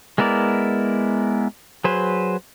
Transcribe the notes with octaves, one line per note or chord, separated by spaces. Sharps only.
G#3 B3 E4 A#4 D5
F#3 G#4 B4 C5